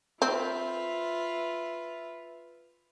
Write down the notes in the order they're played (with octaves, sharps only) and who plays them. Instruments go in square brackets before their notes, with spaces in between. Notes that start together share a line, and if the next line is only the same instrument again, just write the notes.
[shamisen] C4 [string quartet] F4 B4 E5